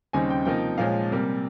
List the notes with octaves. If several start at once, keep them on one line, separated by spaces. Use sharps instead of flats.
D#2 C#3 G3 C4 D#4 G#5
G5
C3 F3 A#3 D#4 G5
A#2 F3 G#3 C#4 F5
C3 G3 A#3